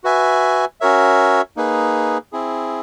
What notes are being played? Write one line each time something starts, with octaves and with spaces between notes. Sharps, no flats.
F#4 B4 E5 G#5
C#4 F#4 A#4 C#5 E5
A#3 D#4 G#4 B4
C4 E4 G#4